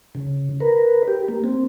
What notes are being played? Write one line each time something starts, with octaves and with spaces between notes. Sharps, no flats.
C#3
A#4 B4
G4
A#3
C4